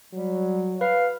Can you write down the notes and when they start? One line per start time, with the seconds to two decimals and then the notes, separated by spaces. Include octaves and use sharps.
0.13 F#3 G3
0.81 B4 F5